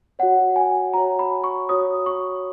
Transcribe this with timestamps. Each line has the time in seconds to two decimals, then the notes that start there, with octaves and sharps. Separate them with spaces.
0.19 F#4 C#5 F#5
0.56 G#5
0.93 F#4 C#5 A#5
1.19 B5
1.44 C#6
1.69 F#4 C#5 D#6
2.06 C#6